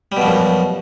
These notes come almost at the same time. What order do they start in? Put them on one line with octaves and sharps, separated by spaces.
G3 B2 F3 F#2